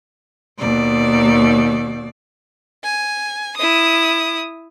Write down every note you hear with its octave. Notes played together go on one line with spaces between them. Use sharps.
D#2 B2 D5
G#5
E4 D#6